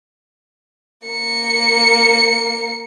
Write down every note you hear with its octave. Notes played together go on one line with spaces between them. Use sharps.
A#3 C#7